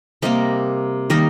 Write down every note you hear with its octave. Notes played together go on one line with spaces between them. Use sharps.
C3 G3 A#3 A#4 D#5
D#3 G3 A#3 A#4 D#5